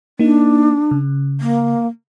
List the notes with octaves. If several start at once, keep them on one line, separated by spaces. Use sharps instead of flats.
A#3 D4 D#4
C#3
A#3